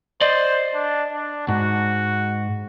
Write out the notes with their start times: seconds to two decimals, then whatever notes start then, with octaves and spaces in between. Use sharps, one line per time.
0.21 C5 D5 D#5
0.74 D4
1.12 D4
1.48 G#2 F#4